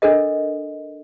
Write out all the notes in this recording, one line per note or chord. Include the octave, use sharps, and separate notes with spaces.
D4 A4 A#4 D#5